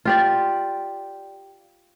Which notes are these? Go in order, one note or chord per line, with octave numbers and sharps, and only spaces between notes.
F4 G4 D5